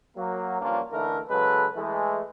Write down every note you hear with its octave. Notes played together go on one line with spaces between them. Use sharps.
F#3 A#3
G2 F3 A#3 C#4 D4 F4
D3 E3 A3 D#4 A#4
C#3 F#3 G#3 A4 B4
E3 G#3 A3